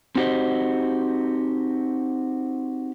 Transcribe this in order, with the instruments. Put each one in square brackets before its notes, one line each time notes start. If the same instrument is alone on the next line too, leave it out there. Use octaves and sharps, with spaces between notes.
[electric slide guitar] C4 D#4 F#4 G4 C5 D#5